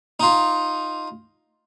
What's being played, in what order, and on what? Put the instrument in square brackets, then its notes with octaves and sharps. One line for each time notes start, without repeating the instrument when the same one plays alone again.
[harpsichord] D#4 F4